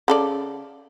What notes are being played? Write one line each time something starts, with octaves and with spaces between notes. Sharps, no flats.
C#3 A4 D5